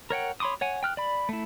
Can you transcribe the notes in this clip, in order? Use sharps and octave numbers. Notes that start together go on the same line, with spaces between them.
A#4 C#5 F#5 G5
C#5 B5 C6 D6 D#6
C#5 F#5 G#5
G5 F6 F#6
D5 B5
A3 E4